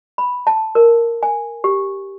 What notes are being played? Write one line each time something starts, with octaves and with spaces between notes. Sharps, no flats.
B5
A5
A#4
G#5
G4